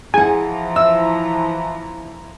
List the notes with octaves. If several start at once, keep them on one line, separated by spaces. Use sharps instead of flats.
E3 F3 G#4 F#5 G#5 A#5
E5 E6